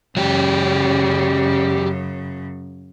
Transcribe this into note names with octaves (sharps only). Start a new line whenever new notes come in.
F#2 C#3 F#3 G4